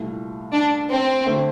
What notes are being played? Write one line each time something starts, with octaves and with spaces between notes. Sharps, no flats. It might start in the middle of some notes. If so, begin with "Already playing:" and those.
Already playing: C2 A#2 A3
D4
C4
D3 A3 C4